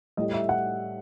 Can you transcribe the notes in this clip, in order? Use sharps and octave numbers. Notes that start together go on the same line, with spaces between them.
A2 G3 D#5
E5
F#5